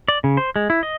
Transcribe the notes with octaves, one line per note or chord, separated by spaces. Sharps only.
D5
C#3
C5
G#3
E4
D#5